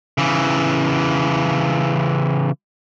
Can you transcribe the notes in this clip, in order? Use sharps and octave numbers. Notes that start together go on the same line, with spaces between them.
C#3 E3